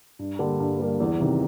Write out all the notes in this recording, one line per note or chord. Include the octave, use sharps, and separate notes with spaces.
G2
D3 G3 A#3
G2
D3 G3 A#3
E2
C3 D#3